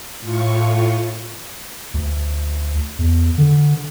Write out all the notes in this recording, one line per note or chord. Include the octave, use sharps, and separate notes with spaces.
A2 F4 C#6
D2
E2
D3